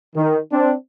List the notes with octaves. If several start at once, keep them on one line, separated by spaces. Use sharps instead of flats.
D#3
C4 D4